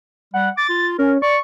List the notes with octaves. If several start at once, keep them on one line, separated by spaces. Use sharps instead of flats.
G3 F#5
D6 A6
F4
C#4 A#4
D5 C#6